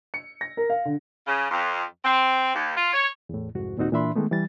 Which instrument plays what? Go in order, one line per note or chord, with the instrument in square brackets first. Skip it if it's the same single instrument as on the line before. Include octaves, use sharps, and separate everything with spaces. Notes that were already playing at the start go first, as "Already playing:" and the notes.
[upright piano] C#7
A#6
A#4
F5
D3
[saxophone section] C#3
F2
C4
D#2
F4
C#5
[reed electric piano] E2 A2
C2 F2 G#2 F#4
D#2 A#2 C4 D#4 F#4
A#2 E3 D4 E5 B5 C6
D#3 G#3 A3 B3
E3 G3 A6